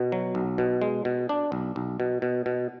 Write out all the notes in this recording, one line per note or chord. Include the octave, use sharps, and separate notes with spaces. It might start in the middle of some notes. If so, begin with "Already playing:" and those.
Already playing: B2
F#3
B1
B2
G#3
B2
D4
B1
B1
B2
B2
B2